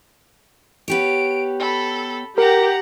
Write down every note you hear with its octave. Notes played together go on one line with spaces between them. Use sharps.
B3 G4 C#5 D7
A4 B5
G4 A#4 F#5 A#5